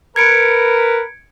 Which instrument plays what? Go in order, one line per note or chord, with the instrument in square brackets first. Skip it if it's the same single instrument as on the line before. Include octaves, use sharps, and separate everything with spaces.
[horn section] A#4 B4 [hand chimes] G#6 C#7 D7